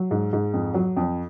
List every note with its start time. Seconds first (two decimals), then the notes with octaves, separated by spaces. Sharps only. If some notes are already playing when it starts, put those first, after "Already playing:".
Already playing: F#3
0.11 G#2
0.33 G#2
0.54 F2
0.74 F#3
0.96 F2